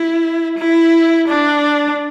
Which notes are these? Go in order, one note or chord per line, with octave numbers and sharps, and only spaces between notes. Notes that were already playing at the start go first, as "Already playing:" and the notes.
Already playing: E4
E4
D4